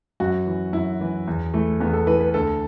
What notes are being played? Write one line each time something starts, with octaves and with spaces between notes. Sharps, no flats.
F#2 F#4
E3
F#2 E4
E3
E2
E3 A3
E2 B3
A4
E3 B4
B4
D2 A4